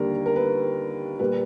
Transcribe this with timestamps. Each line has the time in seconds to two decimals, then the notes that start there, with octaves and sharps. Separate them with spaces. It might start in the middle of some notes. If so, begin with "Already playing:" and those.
Already playing: D#2 D3 G3 A#3 A#4
0.26 A#4
0.36 B4
1.19 A#2 G3 A#3 B4